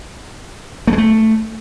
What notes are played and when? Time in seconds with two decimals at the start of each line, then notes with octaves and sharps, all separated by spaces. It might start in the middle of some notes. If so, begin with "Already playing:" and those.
0.87 A3
0.93 G#3
0.98 A3